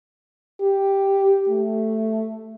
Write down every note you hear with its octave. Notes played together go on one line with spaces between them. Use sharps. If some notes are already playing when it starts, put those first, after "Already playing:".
G4
A3